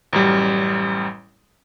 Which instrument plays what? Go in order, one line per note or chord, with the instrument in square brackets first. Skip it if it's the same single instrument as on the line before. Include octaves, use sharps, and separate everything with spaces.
[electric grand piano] A1 F#2 G3